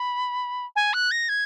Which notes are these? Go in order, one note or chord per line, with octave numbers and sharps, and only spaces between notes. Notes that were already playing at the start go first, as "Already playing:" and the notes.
Already playing: B5
G#5
F#6
A#6
G#6